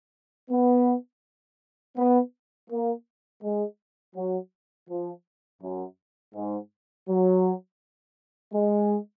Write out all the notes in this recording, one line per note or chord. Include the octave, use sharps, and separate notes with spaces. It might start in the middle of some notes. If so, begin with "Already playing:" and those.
B3
B3
A#3
G#3
F#3
F3
F#2
G#2
F#3
G#3